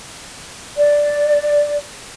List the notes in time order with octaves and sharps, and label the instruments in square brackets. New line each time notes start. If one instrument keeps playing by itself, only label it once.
[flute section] D5